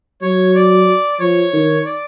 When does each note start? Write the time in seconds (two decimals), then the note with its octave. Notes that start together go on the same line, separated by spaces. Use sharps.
0.22 F#3 C#5
0.55 D5
1.20 F3 C#5
1.53 D#3
1.85 D5